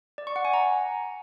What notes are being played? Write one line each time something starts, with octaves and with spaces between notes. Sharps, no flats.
D5
C#6
F#5
G#5
A#5